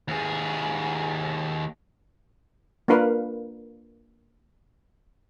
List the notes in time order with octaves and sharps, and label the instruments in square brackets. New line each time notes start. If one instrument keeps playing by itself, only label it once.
[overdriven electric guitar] D#2 G#4
[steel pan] A#3 D4 F4 A#4 B4 F5